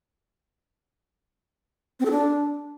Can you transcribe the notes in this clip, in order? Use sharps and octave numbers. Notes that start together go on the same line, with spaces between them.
C4
A4
D4